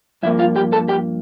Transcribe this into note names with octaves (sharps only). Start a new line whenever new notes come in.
G2 F3 A#3 E4 E5
F4 F5
G4 G5
A4 A5
G4 G5